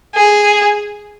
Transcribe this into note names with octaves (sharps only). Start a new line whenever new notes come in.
G#4